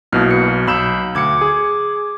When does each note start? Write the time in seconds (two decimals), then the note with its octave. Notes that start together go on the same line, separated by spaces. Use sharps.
0.12 B1 B2 A#3 E4 F6
0.31 C#7
0.67 B1 B5 E6 G6 E7
1.15 D2 D6 G#6 C#7
1.41 G#4